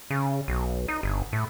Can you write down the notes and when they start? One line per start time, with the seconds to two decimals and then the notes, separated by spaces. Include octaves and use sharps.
0.10 C#3
0.48 B1
0.88 D#4
1.03 G1
1.33 A2